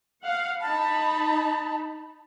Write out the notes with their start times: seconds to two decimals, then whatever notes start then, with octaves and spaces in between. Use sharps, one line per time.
0.25 F5 F#5
0.61 D#4 A5 B5